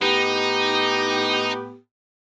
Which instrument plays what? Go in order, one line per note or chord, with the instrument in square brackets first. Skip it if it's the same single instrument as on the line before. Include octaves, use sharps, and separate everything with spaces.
[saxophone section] A2 B3 G4 [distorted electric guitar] D#4